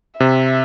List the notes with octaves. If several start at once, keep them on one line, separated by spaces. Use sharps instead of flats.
C3 E5